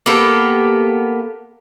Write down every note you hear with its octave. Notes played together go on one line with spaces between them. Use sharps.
A#3 B3 G4 A4